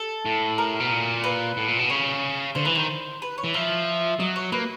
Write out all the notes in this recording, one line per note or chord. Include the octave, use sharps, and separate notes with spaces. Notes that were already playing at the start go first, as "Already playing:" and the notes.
Already playing: A4
A2
A#4
B2
A#2
B4
A2
A#2
B2
C#3 C#5
D3 C5
E3 B4
D#3 C5
B4
C#5
E3
F3 E5
F#3 D#5
C#5
A#3 B4